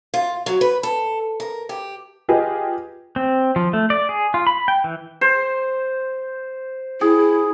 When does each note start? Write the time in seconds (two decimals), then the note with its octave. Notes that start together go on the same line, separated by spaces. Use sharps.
0.14 F4
0.46 F#3
0.61 B4
0.83 A4
1.40 A#4
1.69 G4
2.29 F4 G4 G#4 B4 D#5
3.16 C4
3.56 F3
3.73 A3
3.90 D5
4.09 G#4
4.34 F4
4.47 B5
4.68 G5
4.84 E3
5.21 C5
7.01 E4 G#4